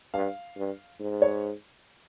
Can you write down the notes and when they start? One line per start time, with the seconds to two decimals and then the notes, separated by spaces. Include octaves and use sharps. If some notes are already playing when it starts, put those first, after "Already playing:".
0.13 G2 F5
0.57 G2
1.00 G#2
1.22 C#5